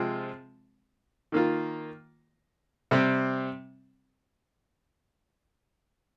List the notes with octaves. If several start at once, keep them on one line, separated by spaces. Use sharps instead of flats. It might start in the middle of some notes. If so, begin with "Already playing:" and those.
Already playing: C3 F3 G#3 C4 F4
D#3 A#3 F4
C3 G3 C4